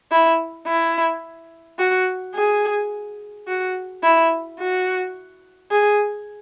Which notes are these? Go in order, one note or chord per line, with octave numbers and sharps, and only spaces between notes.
E4
E4
F#4
G#4
F#4
E4
F#4
G#4